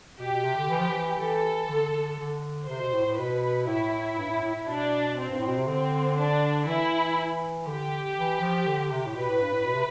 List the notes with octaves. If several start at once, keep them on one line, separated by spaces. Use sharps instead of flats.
B2 G4
B2
C3
D3
E3
F3
E3
E3 A4
D3
D3
C3 C5
B2
A2
A2
B2 B4
A2 E4
G2
A2
A2
A2
B2 D4
C4
G2
A2
B2
C3
D3 C4
D4
E3 E4
D3 G4
E3
F3
D3
C3
A2
B2 B4
A2
G2
A2
B2
C3